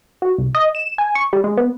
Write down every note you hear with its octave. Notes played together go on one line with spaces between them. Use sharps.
F#4
C2
D#5
E7
G#5
C#6
G3
G#3
B3